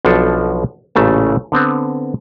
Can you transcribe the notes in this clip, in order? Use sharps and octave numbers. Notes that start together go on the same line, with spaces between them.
B1 B2 F3 D4 A4
A1 A#2 C#3 A3 A5
D3 B3 C4